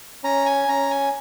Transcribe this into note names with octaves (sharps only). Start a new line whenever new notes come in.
C#4 A#5
G#5
C#4 A#5
G#5